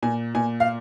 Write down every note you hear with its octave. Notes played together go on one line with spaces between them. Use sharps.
A#2 G#5
A#2 G#5
F5